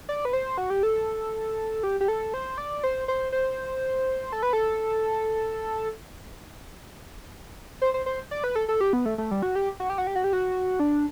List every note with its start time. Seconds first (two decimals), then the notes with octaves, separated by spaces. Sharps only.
0.09 D5
0.25 B4
0.33 C5
0.58 F#4
0.70 G4
0.83 A4
1.83 G4
2.01 G4
2.08 A4
2.34 C5
2.58 D5
2.83 C5
3.08 C5
3.32 C5
4.32 A4
4.43 B4
4.53 A4
7.82 C5
7.94 C5
8.06 C5
8.31 D5
8.44 B4
8.56 A4
8.68 A4
8.81 G4
8.93 B3
9.06 A3
9.18 A3
9.31 G3
9.43 F#4
9.55 G4
9.80 F#4
9.90 G4
9.98 F#4
10.07 G4
10.16 F#4
10.24 G4
10.33 F#4
10.80 D4